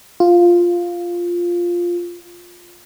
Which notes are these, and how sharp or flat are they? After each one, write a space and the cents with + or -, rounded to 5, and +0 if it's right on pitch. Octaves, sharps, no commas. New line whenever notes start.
F4 +0